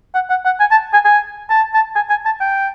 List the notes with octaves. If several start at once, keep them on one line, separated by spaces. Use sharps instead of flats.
F#5
F#5
F#5
G#5
A5
G#5
G#5
A5
A5
G#5
G#5
A5
G5